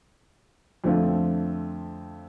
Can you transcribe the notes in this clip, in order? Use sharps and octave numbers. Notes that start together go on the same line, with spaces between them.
F2 D3 A3 C4 F4